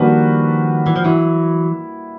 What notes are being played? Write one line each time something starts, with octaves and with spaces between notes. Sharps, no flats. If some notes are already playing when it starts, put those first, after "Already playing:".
Already playing: D#3 F3 G3 A#3 D4 F#4 B4
E3
F3
E3 F#3 E4